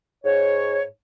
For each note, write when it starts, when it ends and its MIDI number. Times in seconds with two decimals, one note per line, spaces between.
0.24 0.83 44
0.24 0.83 73